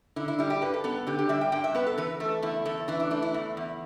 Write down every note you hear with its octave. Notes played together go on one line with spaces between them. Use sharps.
D3 E4
E4
G3 E4
G4
G2 B4
A4
B3 A4
D3 G4
G4
G3 E5
G5
G2 G5
E5
B3 B4
A4
E3 B4
A3 A4
E2 E4
E2 A4
E3 E4
D4
A3 D4
E4
E2
E2